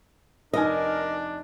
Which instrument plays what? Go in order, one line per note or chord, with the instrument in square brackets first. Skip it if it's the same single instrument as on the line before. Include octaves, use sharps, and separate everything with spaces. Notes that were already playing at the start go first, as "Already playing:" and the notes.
[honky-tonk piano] F1 D#4 G#5 [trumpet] D4 [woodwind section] A#4 [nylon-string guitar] D#5